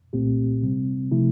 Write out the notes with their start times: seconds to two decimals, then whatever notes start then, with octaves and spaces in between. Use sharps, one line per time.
0.13 C2 A#2 A3 C4 G4
0.62 C3 G3 C4
1.12 C3 F3 A3 E4